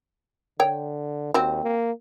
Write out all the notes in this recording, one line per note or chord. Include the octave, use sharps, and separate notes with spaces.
D3 C#5 G5
D#2 C4 F#4
A#3